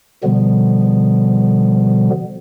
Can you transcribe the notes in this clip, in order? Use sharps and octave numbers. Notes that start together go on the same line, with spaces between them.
B2 D3 F3 G3 B3